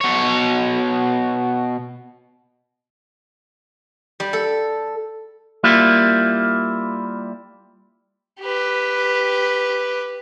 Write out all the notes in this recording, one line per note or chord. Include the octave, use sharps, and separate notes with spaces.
B2 C#5
G3
A4
G3 A#3 E4 F4
G4 B4